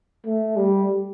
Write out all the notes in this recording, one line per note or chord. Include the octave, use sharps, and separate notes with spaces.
A3
G3